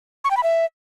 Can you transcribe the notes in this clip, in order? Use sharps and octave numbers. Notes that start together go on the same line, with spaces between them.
C#6
G5
B5
E5